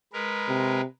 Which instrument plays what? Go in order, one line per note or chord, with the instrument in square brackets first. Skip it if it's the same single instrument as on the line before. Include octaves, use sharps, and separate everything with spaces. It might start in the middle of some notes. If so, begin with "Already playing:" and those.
[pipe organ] G#3 A#4 B4
[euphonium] C3